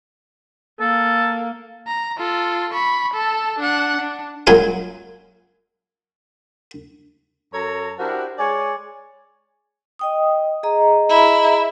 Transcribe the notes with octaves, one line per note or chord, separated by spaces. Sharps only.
A#3 A4
A#5
F4 A4
B5 C#6
A4 A5
D4 F#5
D4
F#2 A#2 F#3 G#3 F5 G#5
F#2 A4 C#5 A5 A#5
D4 E4 F#4 G4 A#4 C5
G#3 C#5 D5 G#5
D#5 G5 D#6
G#4 D#5 A#5
E4